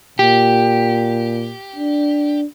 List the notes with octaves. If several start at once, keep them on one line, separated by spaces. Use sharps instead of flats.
A#2 G4
D4